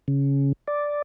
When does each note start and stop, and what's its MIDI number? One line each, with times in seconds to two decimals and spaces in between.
0.08 0.53 49
0.68 1.02 74